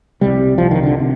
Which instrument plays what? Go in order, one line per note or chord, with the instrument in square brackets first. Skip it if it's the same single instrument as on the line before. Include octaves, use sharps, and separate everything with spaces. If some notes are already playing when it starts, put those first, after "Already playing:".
[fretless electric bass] C2 C3 G3
C2 C3 F3
D#3
D3
C3